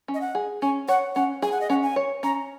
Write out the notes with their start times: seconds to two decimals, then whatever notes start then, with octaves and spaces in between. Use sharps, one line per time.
0.08 C#4
0.14 D#5
0.21 F#5
0.35 G#4
0.62 C#4 G#5
0.88 C#5 F#5
1.15 C#4 F#5
1.42 G#4 G#5
1.52 F#5
1.61 D#5
1.70 C#4 F#5
1.83 G#5
1.96 C#5
2.23 C#4 A#5